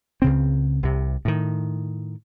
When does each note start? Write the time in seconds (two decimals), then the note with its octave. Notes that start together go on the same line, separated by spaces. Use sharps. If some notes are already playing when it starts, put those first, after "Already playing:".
0.22 C#2 C#3 C4
0.83 C2 C3
1.25 A2 D#3